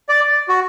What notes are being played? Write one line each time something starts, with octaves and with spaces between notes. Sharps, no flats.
D5
F#4